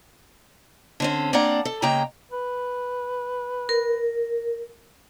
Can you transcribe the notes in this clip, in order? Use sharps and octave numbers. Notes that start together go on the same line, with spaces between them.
D3 C4 C#4
A#3 C4 D4 D5 F#5 A#5
A4
C#3 G#3 A#3 G5 A#5
B4
A#4